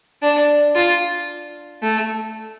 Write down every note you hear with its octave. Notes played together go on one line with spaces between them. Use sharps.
D4
F4
A3